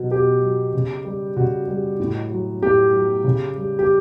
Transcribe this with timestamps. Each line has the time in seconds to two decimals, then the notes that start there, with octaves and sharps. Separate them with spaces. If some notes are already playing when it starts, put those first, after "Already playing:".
Already playing: B2 F#3 F#4
0.11 B2 G4
0.42 F#3
0.74 C#3
1.05 G3
1.36 C#3 F#4
1.68 G3
2.00 A2
2.30 F#3
2.62 A2 G4
2.93 F#3
3.24 C#3
3.56 G3
3.79 G4